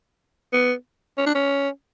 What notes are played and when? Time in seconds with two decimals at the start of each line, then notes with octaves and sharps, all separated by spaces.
0.53 B3
1.18 C#4
1.26 D4
1.35 C#4